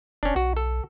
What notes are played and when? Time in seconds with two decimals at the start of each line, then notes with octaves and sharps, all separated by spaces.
0.23 F1 C#4 D4
0.36 B1 F#4
0.57 A4